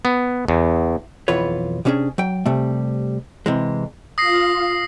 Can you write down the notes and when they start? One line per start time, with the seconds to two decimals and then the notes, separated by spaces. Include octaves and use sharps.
0.05 B3
0.48 E2
1.28 B1 F2 E3 F4 B4 C#5
1.85 C3 G3 C#4 D4 G#4
2.18 F#3 G5
2.46 C3 G3 A3
3.46 C3 E3 G#3
4.18 F4 F5 D#6 A#6 C7